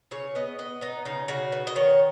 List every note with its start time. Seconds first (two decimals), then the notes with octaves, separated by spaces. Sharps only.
0.11 C#3 C#5
0.35 B3 D#5
0.59 B3 D#5
0.81 B3 D#4
1.05 C#3 D#4
1.28 C#3 F#4
1.52 B3
1.67 D#5
1.76 D#3 C#5